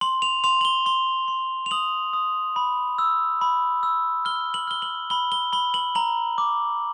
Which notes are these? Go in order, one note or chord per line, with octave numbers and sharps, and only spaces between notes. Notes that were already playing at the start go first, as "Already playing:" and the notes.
C6 F#7
F7
C6 F7
F#7
G7
C6 G7
C6
F7
D#6 F#7
D#6
B5
E6
B5
E6
F6 G7
F#7
F6 G7
F#7
B5 G7
G7
B5 G7
F#7
A#5 F#7
D6